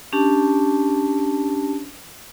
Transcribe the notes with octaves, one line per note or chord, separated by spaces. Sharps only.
C#4 D4 G4 A5